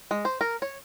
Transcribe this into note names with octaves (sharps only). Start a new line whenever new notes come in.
G#3
C5
A#4
C#5